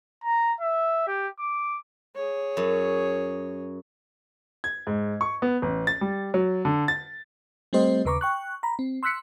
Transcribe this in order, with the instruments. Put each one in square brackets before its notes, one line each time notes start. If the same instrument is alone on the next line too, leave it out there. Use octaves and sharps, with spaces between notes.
[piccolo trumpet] A#5
E5
G4
D6
[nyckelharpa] G#4 C#5
[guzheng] F#2
[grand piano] G#6
G#2
C#6
B3
A1
A6
G3
F#3
D3
A6
[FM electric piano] G3 A3 C4 G4 C5 D#5
D#2 C#3 B4 A#5 C#6 D6
G5 C#6 F#6
A#5 B5
C4
C6 E6 F#6 B6 C#7